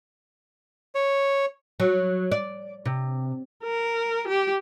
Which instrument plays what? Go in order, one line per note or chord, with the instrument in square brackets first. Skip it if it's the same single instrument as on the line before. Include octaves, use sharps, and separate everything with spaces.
[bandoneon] C#5
[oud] F#3
D5
C3
[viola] A#4
G4